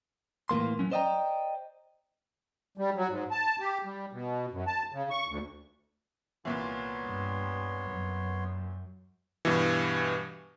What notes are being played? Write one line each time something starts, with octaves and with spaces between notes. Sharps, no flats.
A2 E3 A#3 C6
F#3 C#4
C5 D5 D#5 F5 G5 A#5
G3
F#3
G#2
A5
G4
G3
B2
F#2
A5
C#3
C#6
D2
C2 A#2 E3 B3 C#5 C6
G2
F#2
G2 B2 E3